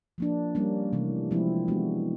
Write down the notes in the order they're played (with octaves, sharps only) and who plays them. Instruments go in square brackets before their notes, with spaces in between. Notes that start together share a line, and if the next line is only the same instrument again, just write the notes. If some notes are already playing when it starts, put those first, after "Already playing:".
[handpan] F3 A#3 D4
G3 A#3 C#4
C3 E3 A3
F3 G#3 C4 E4
E3 G#3 B3 D4 F#4